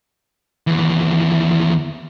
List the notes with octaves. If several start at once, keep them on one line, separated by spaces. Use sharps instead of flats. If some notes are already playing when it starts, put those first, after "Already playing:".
D#2 E3